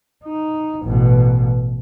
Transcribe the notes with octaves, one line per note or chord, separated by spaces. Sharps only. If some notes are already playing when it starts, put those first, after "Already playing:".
D#4
A1 B2